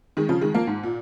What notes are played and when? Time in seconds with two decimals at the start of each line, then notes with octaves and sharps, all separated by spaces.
0.17 D#3 G#3
0.29 C#3 F3
0.41 D#3 G#3
0.55 F3 A#3
0.67 G#2
0.83 A#2